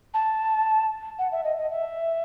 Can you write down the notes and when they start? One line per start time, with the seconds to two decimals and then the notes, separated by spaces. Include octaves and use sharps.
0.14 A5
1.19 F#5
1.32 E5
1.44 D#5
1.58 D#5
1.71 E5